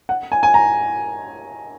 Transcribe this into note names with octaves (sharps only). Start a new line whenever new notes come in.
F#5
G#5
G#5
A#5